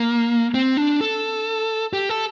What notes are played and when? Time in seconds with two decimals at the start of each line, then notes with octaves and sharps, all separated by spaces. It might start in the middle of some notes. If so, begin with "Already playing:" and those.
Already playing: A#3
0.54 C4
0.77 D4
1.01 A4
1.93 G4
2.09 A4